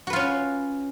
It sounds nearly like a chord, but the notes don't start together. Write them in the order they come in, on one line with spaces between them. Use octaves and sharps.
F#4 B4 F4 C#4